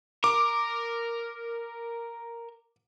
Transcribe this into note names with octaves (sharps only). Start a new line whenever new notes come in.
A#4 D6